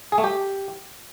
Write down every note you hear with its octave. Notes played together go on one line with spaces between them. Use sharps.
G#4
A3
G4